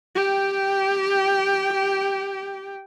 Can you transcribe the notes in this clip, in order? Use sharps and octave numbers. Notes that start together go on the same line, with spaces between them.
G4 G5